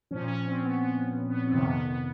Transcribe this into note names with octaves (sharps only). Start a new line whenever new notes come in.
A#2 F3 C#4
C#4
C4
B3
B3
B3
C4
F2 C3 D#3 B3
B3
B3